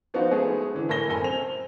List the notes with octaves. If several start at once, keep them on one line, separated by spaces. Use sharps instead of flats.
F3 B3 D#4 F4 F#4 C5
G#3 A3 B3 G#4
D3 E3
A2 A4 A#4 G#5 A#6 G7
F#1 A4 A#4 G#5
C4 F7